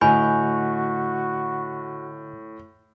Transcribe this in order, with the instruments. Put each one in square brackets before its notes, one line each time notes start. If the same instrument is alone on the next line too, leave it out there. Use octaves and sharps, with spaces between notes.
[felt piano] A2 [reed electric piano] D3 D#5 G6 [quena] F#4 [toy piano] B4 G#5 B5